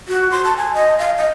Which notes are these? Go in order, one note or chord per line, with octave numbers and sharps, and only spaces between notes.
F#4
C6
A5
G#5
D#5
F5
D#5